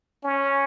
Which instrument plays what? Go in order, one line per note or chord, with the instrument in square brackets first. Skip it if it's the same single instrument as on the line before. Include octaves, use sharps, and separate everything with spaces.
[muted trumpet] C#4